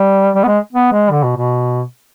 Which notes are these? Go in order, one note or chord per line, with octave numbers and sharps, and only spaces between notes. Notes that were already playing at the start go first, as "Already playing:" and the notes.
Already playing: G3
G3
B3
G#3
B3
G#3
D3
B2
B2